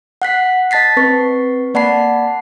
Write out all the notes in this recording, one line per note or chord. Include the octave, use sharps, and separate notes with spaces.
F#5 F#6 B6 C7
D#5 A5 A6 B6 C7
C4 B4 C#6
A#3 D5 F#5 A5 B5 C7